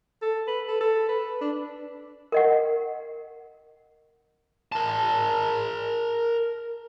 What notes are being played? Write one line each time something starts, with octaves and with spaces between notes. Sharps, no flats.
A4
B4
A4
A4
B4
D4
A#4 D#5 F#5
A#4 A5